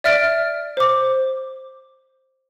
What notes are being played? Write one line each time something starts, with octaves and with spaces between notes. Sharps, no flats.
D5 E5 F6 A6 D7
C5 D6